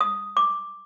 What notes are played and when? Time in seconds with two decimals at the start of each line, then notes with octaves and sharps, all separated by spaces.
0.01 D#6
0.37 D6